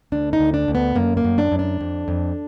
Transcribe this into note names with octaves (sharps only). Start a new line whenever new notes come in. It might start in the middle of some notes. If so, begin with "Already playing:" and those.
D2 D4
D#4
D2
D4
D2
B3
F#2 A#3
A#3
F#2
D4
F#2
D4
F2
F2